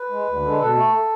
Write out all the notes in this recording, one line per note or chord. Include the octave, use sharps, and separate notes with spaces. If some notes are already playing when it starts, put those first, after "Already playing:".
Already playing: B4
G#3
D2
D3 G#3
B2 A4
A3